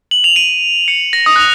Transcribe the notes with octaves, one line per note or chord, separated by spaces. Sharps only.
F#7
F7
D#7
C#7
A#6
D#6
F#6